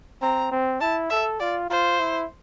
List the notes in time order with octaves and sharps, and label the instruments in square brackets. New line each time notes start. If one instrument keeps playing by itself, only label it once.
[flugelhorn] C4 [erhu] A#5
[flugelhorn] C4
[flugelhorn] E4 [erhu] A5
[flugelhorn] A4 [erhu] E5
[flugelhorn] F4 [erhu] D5
[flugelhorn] F4 [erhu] C5
[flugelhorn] E4